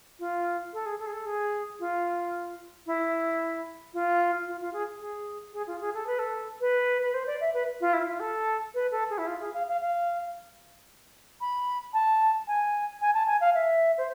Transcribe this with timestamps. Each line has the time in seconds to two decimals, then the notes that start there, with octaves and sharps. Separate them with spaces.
0.19 F4
0.73 A4
0.86 G#4
0.99 A4
1.06 G#4
1.13 A4
1.26 G#4
1.79 F4
2.86 E4
3.93 F4
4.47 F4
4.60 F4
4.73 G#4
5.00 G#4
5.53 G#4
5.67 F4
5.80 G#4
5.94 A4
6.06 B4
6.19 A4
6.60 B4
7.02 B4
7.14 C5
7.27 D5
7.40 E5
7.54 B4
7.80 F4
7.93 E4
8.07 F4
8.20 A4
8.74 B4
8.91 A4
9.10 G#4
9.18 E4
9.27 F4
9.40 G#4
9.53 F5
9.67 F5
9.80 F5
11.41 B5
11.93 A5
12.47 G#5
13.01 G#5
13.14 A5
13.27 G#5
13.41 F5
13.55 E5
13.98 C5